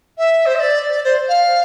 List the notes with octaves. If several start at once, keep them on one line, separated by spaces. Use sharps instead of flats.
E5
C5
E5
D5
D5
C5
F5